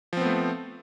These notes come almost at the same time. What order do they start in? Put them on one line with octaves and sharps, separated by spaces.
F3 C4 B3 A3